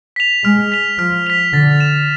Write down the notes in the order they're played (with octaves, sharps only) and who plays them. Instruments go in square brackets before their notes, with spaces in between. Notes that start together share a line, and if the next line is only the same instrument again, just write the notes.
[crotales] B6 F7
[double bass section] G#3 [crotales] F6
[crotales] B6 F7
[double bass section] F3 [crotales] F6
[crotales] B6 F7
[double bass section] D3 [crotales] A6
[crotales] E7